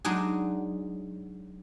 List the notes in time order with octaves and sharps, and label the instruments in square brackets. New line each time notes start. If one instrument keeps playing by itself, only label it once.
[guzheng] F#3 G#3 D4 D#4 G#4